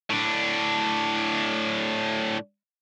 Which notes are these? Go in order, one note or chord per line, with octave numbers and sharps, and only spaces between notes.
A2 D4